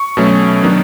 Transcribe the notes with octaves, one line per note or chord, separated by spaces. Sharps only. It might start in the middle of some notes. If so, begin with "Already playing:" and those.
Already playing: C#6
B2 F#3 A3 C#4
D#3 F#3 B3 D4